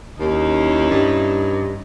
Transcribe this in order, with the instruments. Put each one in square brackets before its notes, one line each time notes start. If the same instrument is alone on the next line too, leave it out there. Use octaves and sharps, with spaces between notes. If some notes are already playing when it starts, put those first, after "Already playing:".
[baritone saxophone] D#2 [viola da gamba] C#4 D#4 E4
[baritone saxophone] G2